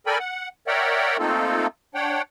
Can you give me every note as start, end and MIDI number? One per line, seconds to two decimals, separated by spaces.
0.06 0.18 69
0.06 0.18 70
0.06 0.18 74
0.06 0.18 79
0.06 0.18 80
0.06 0.18 83
0.19 0.49 78
0.67 1.17 70
0.67 1.17 73
0.67 1.17 74
0.67 1.17 76
0.67 1.17 78
0.67 1.17 79
1.19 1.67 57
1.19 1.67 58
1.19 1.67 60
1.19 1.67 63
1.19 1.67 65
1.19 1.67 69
1.95 2.22 62
1.95 2.22 73
1.95 2.22 78
1.95 2.22 79